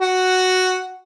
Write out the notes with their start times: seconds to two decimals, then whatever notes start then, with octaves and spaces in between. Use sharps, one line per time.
0.01 F#4 F#5